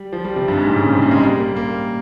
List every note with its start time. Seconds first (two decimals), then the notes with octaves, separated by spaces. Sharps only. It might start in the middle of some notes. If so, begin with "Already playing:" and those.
Already playing: G3
0.13 F3
0.25 G3
0.36 C3
0.48 G2
0.57 G#2
0.67 A#2
0.76 C#3
0.85 A#2
0.93 C3
1.02 C#3
1.11 G#3
1.20 G3
1.38 A#3
1.56 A#3